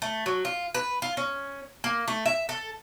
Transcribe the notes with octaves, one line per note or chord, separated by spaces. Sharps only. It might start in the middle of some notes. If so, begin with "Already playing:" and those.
A3
F#3
F4
B4
F4
C#4
A#3
A3
E5
A4